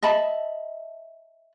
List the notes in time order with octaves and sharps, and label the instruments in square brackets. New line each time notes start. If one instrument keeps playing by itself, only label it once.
[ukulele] D#5 E5 A5 B5